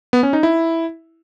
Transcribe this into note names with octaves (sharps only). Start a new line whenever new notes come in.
B3
C#4
D#4
E4